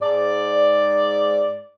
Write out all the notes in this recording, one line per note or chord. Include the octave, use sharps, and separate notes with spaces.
G#2 D5